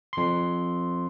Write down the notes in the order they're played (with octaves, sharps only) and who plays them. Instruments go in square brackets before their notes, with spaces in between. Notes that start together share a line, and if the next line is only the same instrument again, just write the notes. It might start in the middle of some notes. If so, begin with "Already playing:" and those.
[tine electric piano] F2 C6